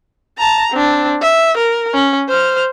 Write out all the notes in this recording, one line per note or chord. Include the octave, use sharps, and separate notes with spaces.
A5 A#5
C4 D4
E5
A#4
C#4
C5 F6